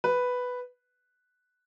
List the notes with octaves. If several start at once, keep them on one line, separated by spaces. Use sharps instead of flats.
B4